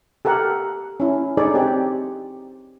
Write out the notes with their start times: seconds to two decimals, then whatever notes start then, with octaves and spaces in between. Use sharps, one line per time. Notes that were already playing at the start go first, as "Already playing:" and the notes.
0.25 G4 A4 A#4 F#5
1.00 C#4 E4
1.37 D4 D#4 G#4 A4 C#5 D5
1.54 C4 G4